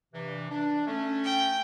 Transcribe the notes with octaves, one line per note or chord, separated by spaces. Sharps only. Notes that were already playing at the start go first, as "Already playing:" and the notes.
G2 C3 E3
D4
A3 C#4
G5